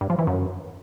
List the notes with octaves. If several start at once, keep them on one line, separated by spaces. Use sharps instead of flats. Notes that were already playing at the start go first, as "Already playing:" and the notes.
G2
F3
E3
F#2